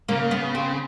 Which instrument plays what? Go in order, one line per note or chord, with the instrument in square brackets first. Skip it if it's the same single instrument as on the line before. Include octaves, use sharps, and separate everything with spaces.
[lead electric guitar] C#3 [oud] A#3
[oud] B3
C4